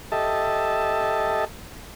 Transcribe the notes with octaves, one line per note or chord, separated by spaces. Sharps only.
G4 A4 D#5 E5 A5